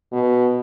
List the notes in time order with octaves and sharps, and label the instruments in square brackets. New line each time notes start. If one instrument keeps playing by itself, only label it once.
[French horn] B2